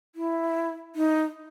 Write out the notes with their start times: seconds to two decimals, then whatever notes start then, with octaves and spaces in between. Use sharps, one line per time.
0.15 E4
0.95 D#4